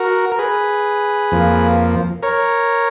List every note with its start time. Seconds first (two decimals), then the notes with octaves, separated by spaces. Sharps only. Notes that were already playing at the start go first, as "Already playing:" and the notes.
Already playing: F#4 A#4
0.32 A#4
0.39 G#4 B4
1.31 F2 F3 A#3
2.23 A#4 C#5